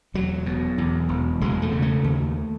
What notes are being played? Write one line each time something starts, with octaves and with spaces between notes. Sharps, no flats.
E1 F#3
B2
E2
E1
E1 G#3
A3
C#3
A3
D#2